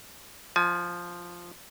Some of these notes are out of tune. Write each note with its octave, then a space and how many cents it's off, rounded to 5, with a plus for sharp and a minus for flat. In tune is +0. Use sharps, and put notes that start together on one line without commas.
F3 +0 G#5 +35